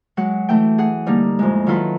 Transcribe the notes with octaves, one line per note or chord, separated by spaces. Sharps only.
F#3 G#3 F#5
E3 A3 G5
G#4 F#5
D3 G3 A#3 D#4
F2 A2 G#3
D#3 F#3 E4 F4 A4 B4